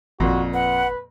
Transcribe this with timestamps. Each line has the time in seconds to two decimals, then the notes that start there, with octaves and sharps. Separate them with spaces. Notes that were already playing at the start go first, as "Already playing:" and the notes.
0.20 G#1 F2 A#2 F#4
0.54 B4 F#5